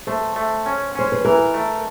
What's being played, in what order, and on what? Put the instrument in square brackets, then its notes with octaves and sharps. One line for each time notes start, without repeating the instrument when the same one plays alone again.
[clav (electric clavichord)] A3 [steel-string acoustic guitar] C5
[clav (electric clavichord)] A3
C#4
[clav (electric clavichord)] C#4 [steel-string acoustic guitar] C5
[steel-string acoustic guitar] B4
[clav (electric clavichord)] E3 [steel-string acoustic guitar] A#4
[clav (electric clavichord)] A3